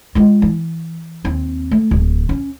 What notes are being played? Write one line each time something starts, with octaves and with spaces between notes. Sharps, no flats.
G#3 F4
E3
D#2 C4
A3
D1
C#4